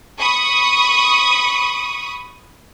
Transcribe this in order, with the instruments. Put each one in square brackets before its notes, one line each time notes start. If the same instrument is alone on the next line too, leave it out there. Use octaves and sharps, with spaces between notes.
[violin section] B5 C#6 D#6